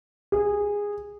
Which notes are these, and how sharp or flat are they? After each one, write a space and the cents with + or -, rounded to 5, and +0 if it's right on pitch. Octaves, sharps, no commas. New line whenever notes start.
G#4 -15